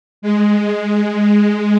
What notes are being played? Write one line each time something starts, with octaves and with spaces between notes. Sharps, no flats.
G#3